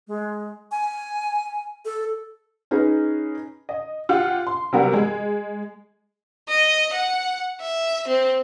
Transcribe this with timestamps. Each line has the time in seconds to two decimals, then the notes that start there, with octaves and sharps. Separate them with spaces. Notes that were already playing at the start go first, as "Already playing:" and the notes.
0.08 G#3
0.71 G#5
1.85 A4
2.71 C#4 D#4 G#4 B4
3.69 D#5
4.09 F4 G4 F#5
4.47 C6
4.73 C3 F#3 G3 B3 F#4 A#4
4.93 G#3
6.49 D#5
6.93 F#5
7.61 E5
8.08 C4